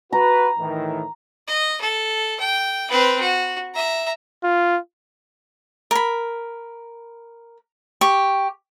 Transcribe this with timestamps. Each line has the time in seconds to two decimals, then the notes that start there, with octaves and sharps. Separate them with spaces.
0.12 F#4 B4 A#5
0.59 A2 D#3 E3
1.48 D#5
1.81 A4
2.40 G5
2.90 C4 B4
3.21 F#4
3.74 E5 A#5
4.44 F4
5.91 A#4 B5
8.01 G4 C#6